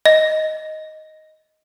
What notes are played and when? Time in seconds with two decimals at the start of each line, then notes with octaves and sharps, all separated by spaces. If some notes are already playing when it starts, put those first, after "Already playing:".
0.05 D#5 A#6